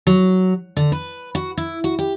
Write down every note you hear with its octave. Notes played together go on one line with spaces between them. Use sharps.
F#3
D3
B4
F#4
E4
F#4
G4